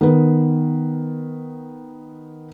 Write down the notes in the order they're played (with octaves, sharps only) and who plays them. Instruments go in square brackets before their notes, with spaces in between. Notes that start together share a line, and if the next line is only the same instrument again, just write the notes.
[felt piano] D#3 B3 B4